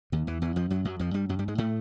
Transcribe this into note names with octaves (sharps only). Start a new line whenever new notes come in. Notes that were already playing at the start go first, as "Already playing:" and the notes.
D#2 D#3
E2 E3
E2 E3
F2 F3
F#2 F#3
F#2 F#3
F2 F3
G2 G3
F#2 F#3
G2 G3
G#2 G#3
A2 A3